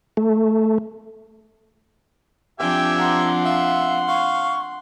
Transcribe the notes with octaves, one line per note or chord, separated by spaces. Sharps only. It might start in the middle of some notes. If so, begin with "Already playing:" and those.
A3
F3 C4 D4 G4 E5 G5 G#5
F#5 A#5 C6
E5 F5
F5 C#6